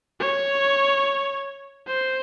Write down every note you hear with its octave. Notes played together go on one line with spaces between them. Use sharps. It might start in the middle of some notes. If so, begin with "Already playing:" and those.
C#5
C5